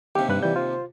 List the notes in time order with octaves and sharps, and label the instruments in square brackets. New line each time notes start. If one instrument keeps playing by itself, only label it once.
[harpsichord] D#2 C3 [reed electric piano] G4
[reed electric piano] G2 B4 F#6
[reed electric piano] E3 G6 [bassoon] G3
[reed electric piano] F4 [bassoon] C5